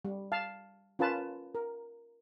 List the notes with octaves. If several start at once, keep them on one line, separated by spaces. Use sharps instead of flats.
G3
F5 A5
C#4 F4 A#4 B4 A5
A#4